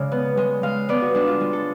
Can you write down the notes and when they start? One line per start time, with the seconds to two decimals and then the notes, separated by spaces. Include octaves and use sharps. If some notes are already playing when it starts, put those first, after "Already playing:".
Already playing: C#3 G#3 D5
0.12 B3
0.37 G#3
0.63 G#3 F5
0.89 B3 D5
1.02 F#4
1.15 G#3 D4
1.27 F4
1.41 G#3
1.53 A4